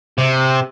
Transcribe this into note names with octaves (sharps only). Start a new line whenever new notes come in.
C3